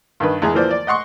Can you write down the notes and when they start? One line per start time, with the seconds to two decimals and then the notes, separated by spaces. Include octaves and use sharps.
0.20 G2 D#3 B4
0.42 E2 G#3 G#4 G#5
0.54 E3 F3 A#3 C5 D5
0.71 D5
0.87 D#5 F#5 C6 C#6